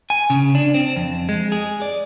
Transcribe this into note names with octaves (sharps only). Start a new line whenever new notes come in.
G#5
C#3
D4
C4
F2
G#3
G#4
D5